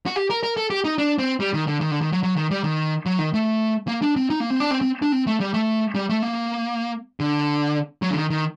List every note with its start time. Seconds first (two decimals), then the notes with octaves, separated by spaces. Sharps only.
0.06 F#4
0.16 G4
0.30 A#4
0.43 A#4
0.57 A4
0.70 G4
0.85 D#4
0.98 D4
1.19 C4
1.40 G3
1.54 D#3
1.67 D3
1.81 D#3
1.91 D3
2.01 D#3
2.12 F#3
2.23 F#3
2.36 D#3
2.51 G3
2.64 D#3
3.06 F#3
3.19 D#3
3.34 A3
3.88 A#3
4.02 D4
4.16 C4
4.30 D#4
4.40 A#3
4.50 C4
4.60 D4
4.71 C4
4.81 C4
5.02 D4
5.12 C4
5.27 A3
5.40 G3
5.54 A3
5.95 G3
6.09 A3
6.22 A#3
7.20 D3
8.02 F#3
8.10 D3
8.16 D#3
8.30 D#3